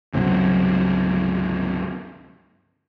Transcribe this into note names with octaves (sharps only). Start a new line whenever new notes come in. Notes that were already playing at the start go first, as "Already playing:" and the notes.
G1 C#2 C3 F#3